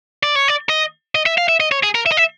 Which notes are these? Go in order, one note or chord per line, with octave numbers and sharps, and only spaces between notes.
D5
C#5
D5
D#5
D#5
E5
F5
E5
D#5
C#5
G#4
A#4
E5
D#5
E5